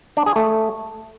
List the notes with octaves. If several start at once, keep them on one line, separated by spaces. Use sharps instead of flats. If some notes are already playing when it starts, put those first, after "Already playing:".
D4
G#4
A3